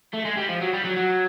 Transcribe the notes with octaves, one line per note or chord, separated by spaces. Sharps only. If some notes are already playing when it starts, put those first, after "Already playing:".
A3
G#3
G3
F3
F#3
G3
F#3
F#3